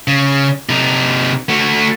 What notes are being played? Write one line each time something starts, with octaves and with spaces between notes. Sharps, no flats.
C#3
C3 D#4
A3 F#4